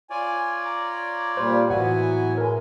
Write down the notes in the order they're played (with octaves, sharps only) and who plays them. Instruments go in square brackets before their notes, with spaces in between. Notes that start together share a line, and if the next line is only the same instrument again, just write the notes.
[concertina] F4 C#5 D5 [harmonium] G#5
[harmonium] A#5
[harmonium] A#2 G3 [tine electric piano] C5
[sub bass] A2 [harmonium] E3 F#3 B3 [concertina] E4 G#5 [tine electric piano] F#5
[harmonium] G#3 [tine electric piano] A#4 G#5